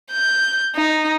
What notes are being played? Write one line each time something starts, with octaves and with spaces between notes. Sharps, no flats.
G6
D#4